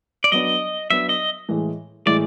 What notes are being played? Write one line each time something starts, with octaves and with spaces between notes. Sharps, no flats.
D5
F#3 B3 D4 D#5
F#3 B3 D4 E5
D#5
A2 E3 G#3
A2 E3 G#3 D5